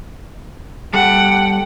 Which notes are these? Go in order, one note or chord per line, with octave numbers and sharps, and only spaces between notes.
G3 A4 F#5 G5